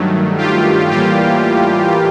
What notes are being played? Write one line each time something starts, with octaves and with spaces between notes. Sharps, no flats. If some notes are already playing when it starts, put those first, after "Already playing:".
Already playing: G2 D#3 F#3 A3
F4 G4
A2 E3 G3 A#3 F4 G4